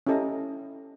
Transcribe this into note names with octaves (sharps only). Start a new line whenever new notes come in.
C#4 E4 G4 A4 D#5 A#5